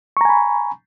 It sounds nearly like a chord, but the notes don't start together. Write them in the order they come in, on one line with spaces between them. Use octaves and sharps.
C#6 A#5 G#5 B5